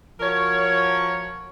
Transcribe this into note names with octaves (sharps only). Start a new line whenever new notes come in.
F3 F#4 A#4 C#5